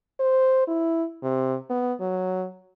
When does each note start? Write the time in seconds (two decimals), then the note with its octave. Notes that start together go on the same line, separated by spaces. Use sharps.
0.20 C5
0.68 E4
1.23 C3
1.70 B3
2.00 F#3